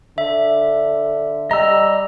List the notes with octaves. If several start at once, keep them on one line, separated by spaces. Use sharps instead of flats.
D3 E5
G3 D#5 A#5 E6